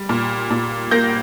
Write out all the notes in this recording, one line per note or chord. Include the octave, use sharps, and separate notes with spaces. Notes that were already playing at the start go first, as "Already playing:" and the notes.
Already playing: G3
A#2
A#2
A#3 G6 A#6